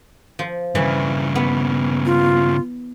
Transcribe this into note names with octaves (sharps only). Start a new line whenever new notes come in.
F3
G2 C#3 E3
B3
F4